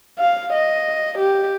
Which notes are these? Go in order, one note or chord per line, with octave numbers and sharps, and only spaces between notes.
F5
D#5
G4